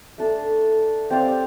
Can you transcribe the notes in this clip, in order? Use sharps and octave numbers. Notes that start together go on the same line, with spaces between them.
A3 D4 A4
C4 G4 D5 F5